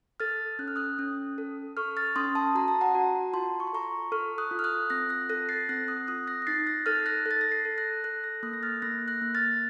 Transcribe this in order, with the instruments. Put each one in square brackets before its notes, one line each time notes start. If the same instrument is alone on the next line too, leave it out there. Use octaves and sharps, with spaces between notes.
[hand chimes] A4 F6 A6
C#4 F#6
F6
D#6 F#6
C#4
A4
A4 C#6 F6
F6 A6
C#4 C6 D#6
A5 C6
F#4 A#5
A5
F#5 A#5
F#4
F4 A5 C6
C#6
C6
A4 A#5 C#6
A4 C#6 F6
D#6 F#6
F4
F6
D#6 F#6
C4 F#6 A#6
F#6 A#6
A4 F#6 A#6
A6 C7
C4 F#6 A#6
D#6 F#6
F4 D#6 F#6
F#6 A#6
A#6
D#4 A6 C7
F#6 A#6
A4 F6 A6
F#6 A#6
A4
A6
A#6
A6 C7
A4
F#6 A#6
A4 F#6 A#6
F#6 A#6
A#3 D#6 F#6
A#6
F6 A6
A#3 F#6 A#6
F#6 A#6
A#3
F6 A6